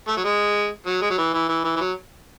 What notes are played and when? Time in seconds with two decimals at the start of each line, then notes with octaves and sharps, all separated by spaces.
0.08 A3
0.17 F#3
0.24 G#3
0.87 F#3
1.02 G#3
1.10 F#3
1.18 E3
1.34 E3
1.49 E3
1.64 E3
1.76 E3
1.81 F#3